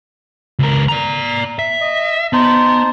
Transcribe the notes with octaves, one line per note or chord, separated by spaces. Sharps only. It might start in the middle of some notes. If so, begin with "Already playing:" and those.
C#2 A#4
D5 A#5
E5
D#5
B3 D#4 C5 A5